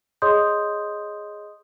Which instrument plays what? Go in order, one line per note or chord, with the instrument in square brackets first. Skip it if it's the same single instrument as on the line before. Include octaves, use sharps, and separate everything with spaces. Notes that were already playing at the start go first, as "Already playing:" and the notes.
[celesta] G#4 C#5 D#5 C6 D#6 G6